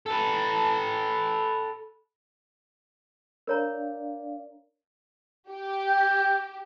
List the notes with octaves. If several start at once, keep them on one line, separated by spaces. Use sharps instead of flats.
A4 B4
D4 A#4 C#5 D5 F5 A#5
G4
G5